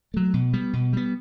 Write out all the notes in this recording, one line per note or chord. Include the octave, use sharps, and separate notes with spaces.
F#3 A3
B2
G3 B3
B2
G3 B3